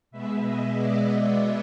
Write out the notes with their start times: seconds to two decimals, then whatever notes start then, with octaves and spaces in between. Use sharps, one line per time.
0.11 B2 G#3 B3 E5
0.42 D#5
0.73 D5
1.04 D5